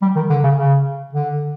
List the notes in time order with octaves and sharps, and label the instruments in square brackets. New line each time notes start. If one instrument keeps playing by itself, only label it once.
[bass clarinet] G3
D#3
D3
C#3
C#3
D3